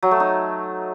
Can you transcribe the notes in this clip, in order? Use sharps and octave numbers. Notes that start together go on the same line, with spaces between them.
F#3
A3
D#4